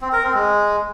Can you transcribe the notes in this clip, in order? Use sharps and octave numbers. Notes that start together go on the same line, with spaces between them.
C4
A#4
C4
G#3